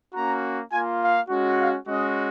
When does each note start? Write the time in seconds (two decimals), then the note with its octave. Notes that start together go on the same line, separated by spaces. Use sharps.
0.14 A#3 C#4 F#4 A#5
0.72 A#3 F4 G#5
1.01 F5
1.30 G#3 C#4 F#4
1.59 F5
1.88 G#3 C#4 F#4 D#5